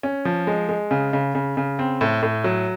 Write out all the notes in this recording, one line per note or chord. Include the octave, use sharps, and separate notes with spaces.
C#4
F3
G#3
G#3
C#3
C#3
C#3
C#3
C4
A2
A2
F#3